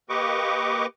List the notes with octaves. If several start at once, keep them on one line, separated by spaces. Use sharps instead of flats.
A#3 G4 B4 D#5 C#6 D6